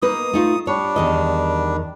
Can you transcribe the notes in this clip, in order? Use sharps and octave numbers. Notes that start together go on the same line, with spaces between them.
A#3 D#4 B4 D#6
A3 D#4 F4
G3 D4 C#5
E2 D#3 D#5